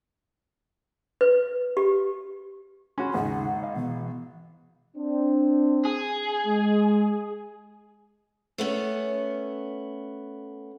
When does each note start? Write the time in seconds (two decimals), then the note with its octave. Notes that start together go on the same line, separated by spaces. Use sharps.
1.21 B4
1.77 G4
2.98 C#4 F#4 B5 C6
3.14 G#1 D#2 C#3 D#4 F#5
3.63 D#5 F5
3.76 B2 E3 B3
4.96 C4 D4
5.85 G#4
6.46 G#3
8.58 A3 B3 C#4